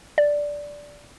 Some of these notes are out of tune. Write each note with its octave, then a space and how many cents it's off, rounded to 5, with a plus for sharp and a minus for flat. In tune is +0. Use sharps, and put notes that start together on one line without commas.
D5 -5